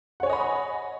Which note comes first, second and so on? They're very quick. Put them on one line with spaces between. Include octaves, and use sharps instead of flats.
F#5 C#5 G#5 D#5 B5